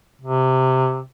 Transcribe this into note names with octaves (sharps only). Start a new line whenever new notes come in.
C3